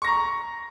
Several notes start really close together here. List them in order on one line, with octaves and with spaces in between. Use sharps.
C#6 A#6 A#5